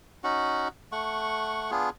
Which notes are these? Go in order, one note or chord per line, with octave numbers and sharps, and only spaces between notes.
C#4 D#4 F#4 F#5
A3 F#5 C#6
B3 D4 F4 G#4